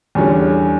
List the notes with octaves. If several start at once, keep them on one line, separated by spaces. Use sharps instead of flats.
E2 D3 G3 C#4